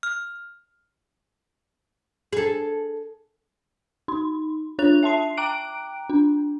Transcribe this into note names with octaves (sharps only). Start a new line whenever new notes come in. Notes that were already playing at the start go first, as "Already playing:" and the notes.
F6
G#4 A4
D#4 C6
D4 F4 C#5 F#6 F7
E5 A5 C6 C7
G5 A#5 D6 F#6 D7
D4